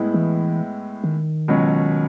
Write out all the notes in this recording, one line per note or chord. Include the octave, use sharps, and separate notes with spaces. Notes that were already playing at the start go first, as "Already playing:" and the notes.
Already playing: A2 G#3 B3 E4
E3
D#3
C#2 B2 F#3 C#4